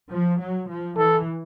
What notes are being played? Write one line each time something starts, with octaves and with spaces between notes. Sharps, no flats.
F3
F#3
F3
E3 A4